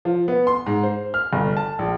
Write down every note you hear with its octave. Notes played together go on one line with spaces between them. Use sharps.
F3
B3
C6
G#2
C5
F6
G1
A5
A#1